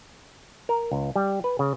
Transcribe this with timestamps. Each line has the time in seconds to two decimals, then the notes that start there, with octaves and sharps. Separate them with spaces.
0.69 A#4
0.92 C#2
1.16 G3
1.44 B4
1.59 C#3